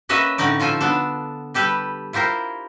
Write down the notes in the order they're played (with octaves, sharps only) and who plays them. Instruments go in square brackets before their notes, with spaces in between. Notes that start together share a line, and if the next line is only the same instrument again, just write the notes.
[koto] A#3 C#4 B4 D#5 E5 F#5
A2 D3 C#4 D#4 D5
F3 F4 A4 G#5
B3 D4 A4
G3 G4 A4 B4
E4 F4 G4 A#4 C5